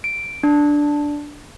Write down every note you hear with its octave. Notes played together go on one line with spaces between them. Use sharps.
D7
D4